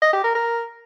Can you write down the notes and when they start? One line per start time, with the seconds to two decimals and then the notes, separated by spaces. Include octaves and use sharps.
0.02 D#5
0.13 G4
0.24 A#4
0.35 A#4